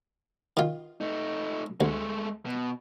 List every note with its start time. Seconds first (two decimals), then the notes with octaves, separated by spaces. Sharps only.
0.57 D#3 F4
1.01 A3 D#4
1.81 D2 G#3 A3
2.46 B2